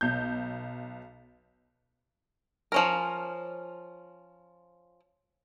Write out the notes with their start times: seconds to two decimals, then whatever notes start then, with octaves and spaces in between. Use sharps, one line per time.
0.01 B1 G6
2.72 F3 C#4 A#4